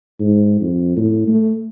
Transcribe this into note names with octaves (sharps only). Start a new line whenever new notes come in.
G#2
F2
A2
A3